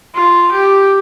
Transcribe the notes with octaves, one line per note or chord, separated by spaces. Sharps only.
F4
G4